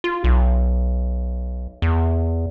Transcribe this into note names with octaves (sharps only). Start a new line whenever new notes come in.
F4
B1
E2